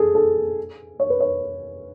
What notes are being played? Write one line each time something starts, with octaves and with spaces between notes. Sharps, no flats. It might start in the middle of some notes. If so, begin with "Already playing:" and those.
Already playing: G#4 A4
A4
C#5
B4
C#5